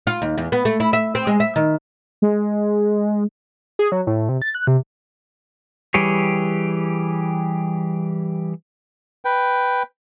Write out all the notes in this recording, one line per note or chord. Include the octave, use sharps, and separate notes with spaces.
F4
D#2
E2
B3
A3
E4
E5
C4
G#3
E5
D#3
G#3
G#4
F#3
A2
C3
A6
F#6
C3
E3 G3 G4 G#4 C#5
B4 G5